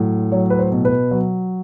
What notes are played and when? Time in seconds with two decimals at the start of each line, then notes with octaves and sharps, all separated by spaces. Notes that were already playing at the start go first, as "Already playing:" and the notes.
Already playing: A2 F#3
0.32 F#3 C#5
0.50 B4
0.59 C5
0.72 B2
0.85 B4
1.11 F#3